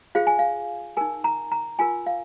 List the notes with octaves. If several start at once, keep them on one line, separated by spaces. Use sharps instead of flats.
F4 G#4 C5 F5
G#5
F5
D#4 A#4 G#5
A#5
A#5
F4 A#4 G#5
F5